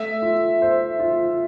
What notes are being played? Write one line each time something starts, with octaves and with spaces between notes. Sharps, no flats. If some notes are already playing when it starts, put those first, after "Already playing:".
Already playing: A3 E5
F4
C5
F4